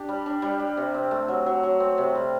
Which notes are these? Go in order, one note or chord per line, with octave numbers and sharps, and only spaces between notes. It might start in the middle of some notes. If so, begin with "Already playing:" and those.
Already playing: D4 G4
G3
D4
G3
G3
C3
C4
A3
F#3
F#3
F#3
C4
C3
G3